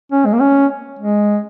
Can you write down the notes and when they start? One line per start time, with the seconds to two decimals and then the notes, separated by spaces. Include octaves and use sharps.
0.12 C#4
0.26 G#3
0.33 A#3
0.40 C#4
0.99 G#3